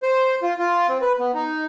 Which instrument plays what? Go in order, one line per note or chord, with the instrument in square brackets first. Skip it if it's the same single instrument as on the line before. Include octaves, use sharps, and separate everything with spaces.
[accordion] C5
F4
F4
C4
B4
B3
D#4